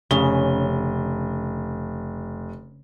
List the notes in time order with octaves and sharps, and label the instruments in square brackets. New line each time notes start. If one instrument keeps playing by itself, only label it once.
[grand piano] F1 G7 [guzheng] C#3